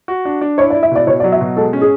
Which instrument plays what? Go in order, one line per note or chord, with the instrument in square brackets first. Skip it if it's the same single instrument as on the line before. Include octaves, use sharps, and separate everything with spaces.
[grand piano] F#4
D4
D4
[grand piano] E4 [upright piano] C#5
[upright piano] D5
[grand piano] E4
[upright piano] E5
[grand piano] B2 [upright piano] D5
[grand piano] B2 [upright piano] C#5
[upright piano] D5
[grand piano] F#3
[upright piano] E5
[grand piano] B2
[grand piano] G#3 [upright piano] A4
[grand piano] C#4
[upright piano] G#4